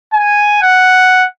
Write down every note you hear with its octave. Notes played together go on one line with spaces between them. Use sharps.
G#5
F#5